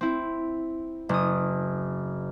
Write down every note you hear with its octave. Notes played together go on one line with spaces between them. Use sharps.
C4 E4
F#1 D#6